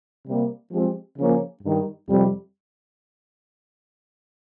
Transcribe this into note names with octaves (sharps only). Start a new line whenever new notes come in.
C3 G3 A#3
F3 G#3 C4 G4
C#3 F3 A#3 C#4
G2 D#3 G3
F2 C3 G3